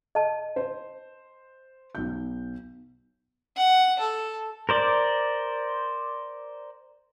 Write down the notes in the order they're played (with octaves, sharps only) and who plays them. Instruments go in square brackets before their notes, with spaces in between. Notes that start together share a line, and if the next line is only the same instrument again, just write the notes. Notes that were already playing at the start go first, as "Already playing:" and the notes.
[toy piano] D#5 A5
[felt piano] C5
B1 G6
[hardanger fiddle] F#5
A4
[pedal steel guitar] A#4 C5 D5